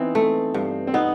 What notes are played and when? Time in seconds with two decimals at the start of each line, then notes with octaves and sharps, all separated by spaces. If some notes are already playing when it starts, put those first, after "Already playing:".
Already playing: E3 B3 C4 D#4
0.15 A3
0.54 G2
0.87 C4
0.94 B3 D#4